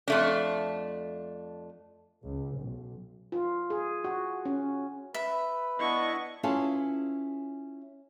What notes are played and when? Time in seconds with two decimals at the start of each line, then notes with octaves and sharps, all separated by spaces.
0.08 F2 A3 D4
2.23 C#2
2.58 B1
3.32 F4
3.70 G#4
4.04 F#4
4.45 C#4
5.14 B4 E5
5.79 B3 D4 E4 D#5 C#6
6.43 C#4 E4 F4 G#4 B4 A5